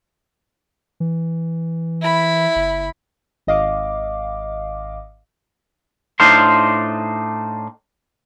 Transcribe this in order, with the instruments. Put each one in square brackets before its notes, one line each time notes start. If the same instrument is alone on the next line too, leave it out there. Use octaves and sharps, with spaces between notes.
[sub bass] E3
[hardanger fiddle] E4 B5
[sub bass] F#1
[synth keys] G#1 D#5 F5 D6
[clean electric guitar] A2 D4 D#4 C5 F5 C6